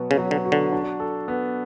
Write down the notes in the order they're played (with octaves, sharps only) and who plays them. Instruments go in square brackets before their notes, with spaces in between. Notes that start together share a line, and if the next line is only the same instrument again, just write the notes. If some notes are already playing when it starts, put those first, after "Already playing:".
Already playing: [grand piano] B2 F#3 B3 F#4
[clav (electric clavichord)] C#3
[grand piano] F#3
[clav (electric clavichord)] D3
[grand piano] F#4
[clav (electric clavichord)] D3
[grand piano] D4
A4
B3